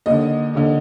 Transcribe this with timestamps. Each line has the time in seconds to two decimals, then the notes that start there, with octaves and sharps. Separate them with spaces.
0.06 D#2 D3 D#5
0.55 D#2 D3